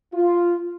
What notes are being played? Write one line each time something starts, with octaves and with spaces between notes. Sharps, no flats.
F4